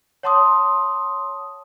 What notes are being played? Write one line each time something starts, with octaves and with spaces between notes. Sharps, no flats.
C#5 F#5 A5 C6 D6 D#6